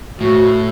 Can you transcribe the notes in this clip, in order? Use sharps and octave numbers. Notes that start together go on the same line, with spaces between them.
A2 F#4